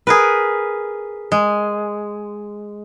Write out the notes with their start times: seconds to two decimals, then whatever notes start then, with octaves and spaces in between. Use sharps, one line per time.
0.07 G#4 A#4 B4
1.32 G#3